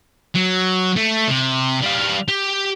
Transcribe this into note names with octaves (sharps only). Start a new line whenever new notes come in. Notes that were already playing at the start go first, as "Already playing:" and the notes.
F#3
A3
C3
G3 F5
G4